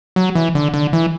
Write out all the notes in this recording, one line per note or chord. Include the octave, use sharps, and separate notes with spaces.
F#3
E3
D3
D3
E3